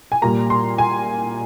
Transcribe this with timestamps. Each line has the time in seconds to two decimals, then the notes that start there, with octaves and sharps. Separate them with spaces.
0.12 G#5
0.22 A#2 G3 A#3 A#5
0.50 C6
0.78 G#5